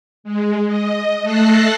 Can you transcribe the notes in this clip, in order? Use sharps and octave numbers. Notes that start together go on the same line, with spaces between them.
G#3
D#5
A3 A4 A5 F#6 A#6 C7